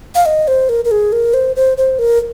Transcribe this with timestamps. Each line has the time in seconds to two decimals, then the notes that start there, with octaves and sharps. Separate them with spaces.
0.15 F5
0.26 D#5
0.48 C5
0.69 A#4
0.85 A#4
0.91 G#4
1.12 A#4
1.34 C5
1.56 C5
1.77 C5
1.99 A#4